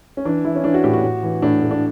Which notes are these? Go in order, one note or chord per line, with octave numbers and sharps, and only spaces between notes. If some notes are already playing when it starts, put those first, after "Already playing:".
C#4
E3 D4
E3 E4
C#4
E3 D4
F#4
A2 G4
F#4
A2
E3
A2 D4
A2
D4